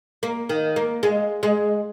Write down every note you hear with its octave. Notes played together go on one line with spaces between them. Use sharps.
A#3
D#3
A#3
G#3
G#3